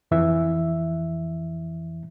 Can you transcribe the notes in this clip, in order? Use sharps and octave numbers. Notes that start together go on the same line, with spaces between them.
F2 E3 E5